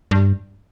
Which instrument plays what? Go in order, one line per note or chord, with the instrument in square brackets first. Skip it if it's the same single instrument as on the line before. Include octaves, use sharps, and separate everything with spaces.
[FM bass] G2